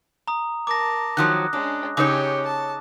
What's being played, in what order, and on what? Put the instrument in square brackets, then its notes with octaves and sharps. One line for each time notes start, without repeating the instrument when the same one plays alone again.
[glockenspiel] A#5 D#6
[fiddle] A#4 A5 [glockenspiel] D6 A#6
[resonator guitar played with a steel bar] D#3 F3 F#3 [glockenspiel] D#6 F#6
[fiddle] G#3 C#4 [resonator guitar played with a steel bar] D4
[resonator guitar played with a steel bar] C#3 D#4 C#5 [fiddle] C#4 G4 [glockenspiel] D6
[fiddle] A5